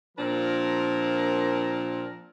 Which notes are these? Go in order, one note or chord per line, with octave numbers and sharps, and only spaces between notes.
A#2 F3 C4 D4 A#4